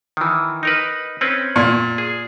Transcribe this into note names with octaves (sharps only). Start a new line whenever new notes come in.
D#3 E3
D#4 A#4 B4
C4 C#4 B4
A#2
G#4